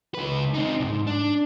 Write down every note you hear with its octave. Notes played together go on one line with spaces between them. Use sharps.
C#2 B4
C4 D#4
C2 G#2
D4